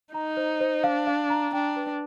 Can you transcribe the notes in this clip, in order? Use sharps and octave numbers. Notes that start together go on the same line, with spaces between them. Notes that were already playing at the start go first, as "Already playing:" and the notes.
D#4 A#5
C5
C5
D4 F5
F5
A#5
D4 G5
B4